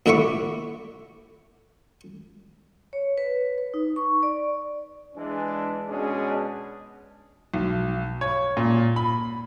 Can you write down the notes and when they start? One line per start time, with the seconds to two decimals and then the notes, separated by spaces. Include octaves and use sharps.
0.06 A#2 D3 E4 E5 C#6 D6
2.93 C#5
3.18 B4
3.58 B4
3.74 D#4
3.96 C#6
4.23 D5
5.16 E3 G#3 D4
5.89 B2 G#3 C#4 D4 G#4
7.54 B1
8.21 C#5
8.57 A#2
8.96 B5